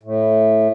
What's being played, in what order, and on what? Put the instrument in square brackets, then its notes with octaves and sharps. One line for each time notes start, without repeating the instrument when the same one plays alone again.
[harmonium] A2